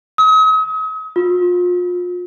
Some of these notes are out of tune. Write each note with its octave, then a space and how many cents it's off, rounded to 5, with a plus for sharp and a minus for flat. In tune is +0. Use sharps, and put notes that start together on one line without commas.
D#6 +40
F4 +35